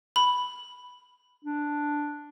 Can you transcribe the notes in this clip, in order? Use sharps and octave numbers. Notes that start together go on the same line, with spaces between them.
B5
D4